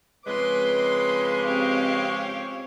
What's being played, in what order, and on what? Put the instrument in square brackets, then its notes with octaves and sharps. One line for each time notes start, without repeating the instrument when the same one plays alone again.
[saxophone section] F2 C#3 G#3 [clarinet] B4 [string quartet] C6 [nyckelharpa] D6
[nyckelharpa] C4 C#5 [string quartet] C#4 G4 F5